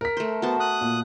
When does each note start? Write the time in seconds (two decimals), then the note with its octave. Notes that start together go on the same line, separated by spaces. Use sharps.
0.01 A#4 B6
0.17 A3 C5
0.42 B3 F#4 C5 A5
0.60 D#6 F#6
0.81 A#2